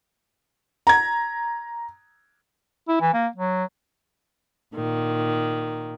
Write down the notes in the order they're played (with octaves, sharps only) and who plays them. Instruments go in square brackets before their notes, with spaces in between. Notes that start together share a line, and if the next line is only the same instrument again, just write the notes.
[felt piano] A#5 G#6
[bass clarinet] E4
E3
A#3
F#3
[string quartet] A#2 D#3